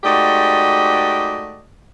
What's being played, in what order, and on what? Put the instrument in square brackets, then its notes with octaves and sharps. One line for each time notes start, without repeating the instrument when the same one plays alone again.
[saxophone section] G#2 A3 F#4 G4 D5 D#5